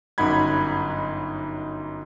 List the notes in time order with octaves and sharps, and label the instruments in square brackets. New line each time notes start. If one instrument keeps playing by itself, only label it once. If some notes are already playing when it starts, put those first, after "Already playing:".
[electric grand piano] G1 F#2 D#4 F#5 B5 G#6